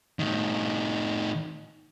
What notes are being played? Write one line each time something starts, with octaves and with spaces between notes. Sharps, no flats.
A2 D#3